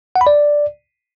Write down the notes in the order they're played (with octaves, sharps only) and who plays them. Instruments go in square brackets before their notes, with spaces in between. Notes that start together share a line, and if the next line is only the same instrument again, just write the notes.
[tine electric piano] F#5
B5
D5